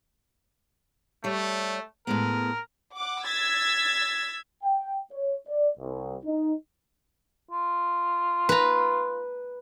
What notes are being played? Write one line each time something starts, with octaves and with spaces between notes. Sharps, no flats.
G3 A3 C#5
A2 G#3 B3 A#4
F#5 D6
E6 G#6 A6 B6
G5
C#5
D5
C2
D#4
F4
B4 A#5